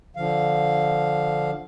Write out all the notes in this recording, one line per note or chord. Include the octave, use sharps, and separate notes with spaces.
D3 F3 F5